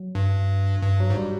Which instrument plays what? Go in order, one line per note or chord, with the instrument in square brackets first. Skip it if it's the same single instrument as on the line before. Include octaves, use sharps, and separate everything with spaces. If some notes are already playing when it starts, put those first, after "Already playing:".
Already playing: [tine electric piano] F#3
[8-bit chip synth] G2
G2
[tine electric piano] F#3
[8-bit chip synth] G#2
[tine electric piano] G3